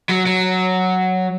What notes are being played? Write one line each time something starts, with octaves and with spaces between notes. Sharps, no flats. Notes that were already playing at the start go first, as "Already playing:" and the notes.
F#3
F#3